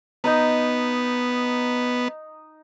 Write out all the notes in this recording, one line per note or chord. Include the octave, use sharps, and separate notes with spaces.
B3 D#4 D#5 A#5